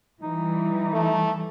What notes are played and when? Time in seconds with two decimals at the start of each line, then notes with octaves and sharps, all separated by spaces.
0.22 E3 G3 D#4
0.93 A3